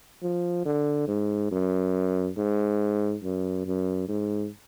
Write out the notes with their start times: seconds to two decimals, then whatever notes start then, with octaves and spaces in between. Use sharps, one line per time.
0.23 F3
0.65 D3
1.08 G#2
1.52 F#2
2.38 G#2
3.23 F#2
3.66 F#2
4.08 G#2